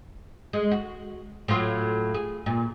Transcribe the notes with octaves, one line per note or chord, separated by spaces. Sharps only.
G#3
F#4
A2 F#3 F4
G#4
A#2